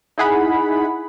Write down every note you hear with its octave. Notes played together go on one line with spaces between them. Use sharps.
D#4 E4 G#4 F#5 B5